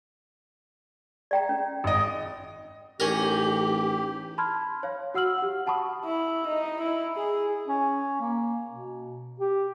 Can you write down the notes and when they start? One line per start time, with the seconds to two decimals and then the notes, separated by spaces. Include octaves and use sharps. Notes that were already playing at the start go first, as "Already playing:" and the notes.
1.31 D5 G5 A#5
1.49 C#4
1.84 G#1 D#5
3.00 A1 C#4 D#4 G4 A#4
4.38 A5 B5 C6 F6 G#6
4.83 C#5 F5
5.14 F#4 F#5 E6 F6 F#7
5.38 G4 F#5
5.67 F#5 A5 B5 C#6 D#6
6.05 E4
6.48 D#4
6.81 E4
7.16 G#4
7.68 C#4
8.21 A#3
8.70 B2
9.40 G4